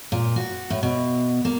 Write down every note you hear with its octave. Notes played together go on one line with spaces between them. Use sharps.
A#2
F#4
A2
B2
A#3